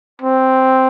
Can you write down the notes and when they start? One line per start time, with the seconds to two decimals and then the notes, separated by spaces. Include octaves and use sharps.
0.22 C4